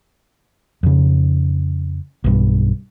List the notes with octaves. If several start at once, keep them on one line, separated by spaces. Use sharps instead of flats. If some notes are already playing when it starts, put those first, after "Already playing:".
F2 C#3
B1 G2